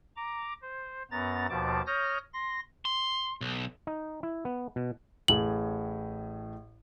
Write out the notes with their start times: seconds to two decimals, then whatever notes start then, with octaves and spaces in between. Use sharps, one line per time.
0.16 A#5 D6
0.62 C5
1.11 F#2 B3 A#5 A6
1.49 D#2 B2 F3 A5 D6
1.87 C#5 D#6 F6 G6 A#6
2.34 C6 A#6
2.85 C6
3.41 B1
3.87 D#4
4.23 E4
4.45 B3
4.76 B2
5.28 A1 A2 G#4 F#7